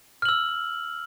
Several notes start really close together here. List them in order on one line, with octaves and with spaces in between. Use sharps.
F6 F#7 E6